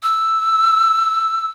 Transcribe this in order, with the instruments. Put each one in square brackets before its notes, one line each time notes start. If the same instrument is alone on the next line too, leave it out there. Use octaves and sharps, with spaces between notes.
[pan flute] E6